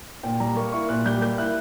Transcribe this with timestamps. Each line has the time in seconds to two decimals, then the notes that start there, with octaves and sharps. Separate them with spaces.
0.23 A#2 G5
0.40 G3 A#5
0.56 A#3 C#6
0.72 E4 C#6
0.89 A#2 F#6
1.05 G3 G6
1.22 A#3 G6
1.38 E4 F#6